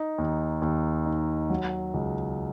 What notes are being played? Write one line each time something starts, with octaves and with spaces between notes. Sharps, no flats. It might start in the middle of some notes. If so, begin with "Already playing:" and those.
Already playing: D#4
D#2
D#2
D#4
F#3
C#2